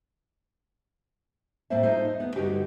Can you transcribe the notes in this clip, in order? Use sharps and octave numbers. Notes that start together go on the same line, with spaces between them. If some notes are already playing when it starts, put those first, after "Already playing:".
A2 A#3 C4 C5 E5
D#4 F4 A4 C5
D#4
B3
G2 D3 D#4 F#4 G4